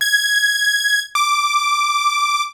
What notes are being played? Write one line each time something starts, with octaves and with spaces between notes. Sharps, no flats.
G#6
D6